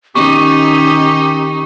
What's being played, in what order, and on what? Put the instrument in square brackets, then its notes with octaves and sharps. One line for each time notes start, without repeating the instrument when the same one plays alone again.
[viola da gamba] D#3 D#4 [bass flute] C#4 [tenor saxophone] G4 [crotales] C#6